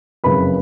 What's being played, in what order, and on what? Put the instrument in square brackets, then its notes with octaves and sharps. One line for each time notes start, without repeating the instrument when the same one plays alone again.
[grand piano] F#1 F2 C#3 B4 B5